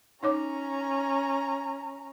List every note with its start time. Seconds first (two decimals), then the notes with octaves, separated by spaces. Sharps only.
0.23 C#4 D#4 C#5 A#5 D6